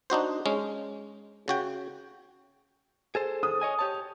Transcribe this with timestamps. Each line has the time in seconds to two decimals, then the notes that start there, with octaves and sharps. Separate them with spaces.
0.10 D4 D#4 F#4 C5
0.46 G#3 C#4
1.48 C#3 F#4 G5
3.15 G#4 A4 C5
3.43 D#6
3.61 C#5 D#5 G#5
3.79 G4 C#5 A5